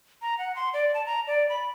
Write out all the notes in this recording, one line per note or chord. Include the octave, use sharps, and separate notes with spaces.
A#5
F#5
C6
D5
A5
A#5
D5
B5